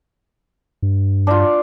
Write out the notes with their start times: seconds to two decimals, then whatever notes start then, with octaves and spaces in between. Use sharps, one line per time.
0.83 G2
1.27 D4 F4